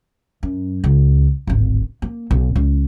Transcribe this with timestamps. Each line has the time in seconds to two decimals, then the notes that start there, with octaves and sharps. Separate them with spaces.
0.43 F#2
0.84 C#2
1.47 D1 G#1
2.02 A#3
2.31 B1
2.56 C#2